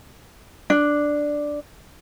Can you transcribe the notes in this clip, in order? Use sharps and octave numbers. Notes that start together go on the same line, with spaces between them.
D4